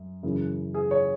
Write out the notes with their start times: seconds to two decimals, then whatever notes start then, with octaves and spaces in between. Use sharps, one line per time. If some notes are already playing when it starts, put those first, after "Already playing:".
Already playing: F#2
0.23 F#2 C#3 E3
0.74 G#4
0.91 C#5